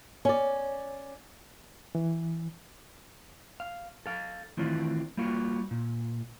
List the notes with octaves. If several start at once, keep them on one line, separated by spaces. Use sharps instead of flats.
C#4 D5
E3
F5
A4 F5
D#3 E3 A3 C4 D4 F4
G3 A#3 F4 F#4
A#2